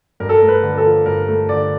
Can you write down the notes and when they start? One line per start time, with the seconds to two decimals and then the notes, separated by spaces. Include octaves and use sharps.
0.20 G2 A#4
0.29 A4
0.39 A3 A#4
0.48 B4
0.63 D3
0.73 A#4
0.78 A4
0.85 F3
1.06 G2 A#4
1.28 A3
1.49 D3 D5